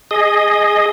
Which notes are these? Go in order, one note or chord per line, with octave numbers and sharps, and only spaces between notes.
G#4 D#5